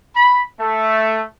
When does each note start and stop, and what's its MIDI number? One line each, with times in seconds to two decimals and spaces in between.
0.15 0.41 83
0.58 1.22 57